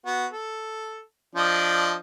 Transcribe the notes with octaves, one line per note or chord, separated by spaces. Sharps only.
B3 F#4
A4
F3 D4 D#5